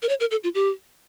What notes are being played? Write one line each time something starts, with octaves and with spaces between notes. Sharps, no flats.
A#4
C#5
A#4
A4
F4
G4